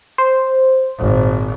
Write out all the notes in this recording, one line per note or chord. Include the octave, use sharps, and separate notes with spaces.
C5
G#1 A#2